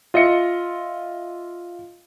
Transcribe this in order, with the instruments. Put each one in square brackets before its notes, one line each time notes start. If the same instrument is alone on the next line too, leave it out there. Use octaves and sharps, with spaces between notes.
[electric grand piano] F4 D#5 E5 C#7